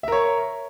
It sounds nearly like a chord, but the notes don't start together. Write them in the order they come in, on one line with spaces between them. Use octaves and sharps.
E5 A#4 C#5